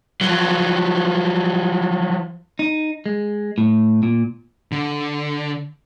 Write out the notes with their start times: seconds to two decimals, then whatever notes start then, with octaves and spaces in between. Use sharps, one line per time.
0.21 F3 F#3
2.59 D#4
3.06 G#3
3.58 A2
4.03 A#2
4.72 D3